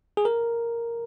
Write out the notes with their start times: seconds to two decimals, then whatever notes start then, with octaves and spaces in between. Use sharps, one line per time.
0.17 G#4
0.25 A#4